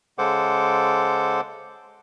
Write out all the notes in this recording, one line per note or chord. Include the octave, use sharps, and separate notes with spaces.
C#3 G#3 A4 C5 F#5 D6